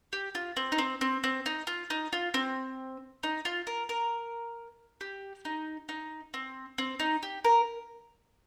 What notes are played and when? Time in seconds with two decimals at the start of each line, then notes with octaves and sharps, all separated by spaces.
0.13 G4
0.35 F4
0.57 C4
0.72 D#4
0.78 C4
1.01 C4
1.24 C4
1.46 D#4
1.67 F4
1.90 D#4
2.13 F4
2.34 C4
3.23 D#4
3.45 F4
3.67 A#4
3.89 A#4
5.01 G4
5.45 D#4
5.89 D#4
6.34 C4
6.78 C4
7.00 D#4
7.23 G4
7.44 A#4